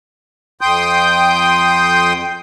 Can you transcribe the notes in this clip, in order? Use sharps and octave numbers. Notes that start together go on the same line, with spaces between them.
F2 G5 C6 D#6 G6